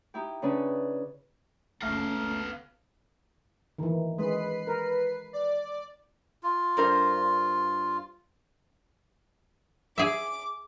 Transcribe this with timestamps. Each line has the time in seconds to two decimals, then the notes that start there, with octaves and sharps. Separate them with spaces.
0.14 D#4 E4 G4
0.42 C#3 C#4 D4 B4
1.82 F#1 C#2 A3 B3 C#4 F5 F6
3.78 D#3 E3
4.18 G#3 B4 C7
4.67 A#4
5.33 D5
6.43 F4
6.77 G2 A#4 C5
9.98 G#4 E5 D6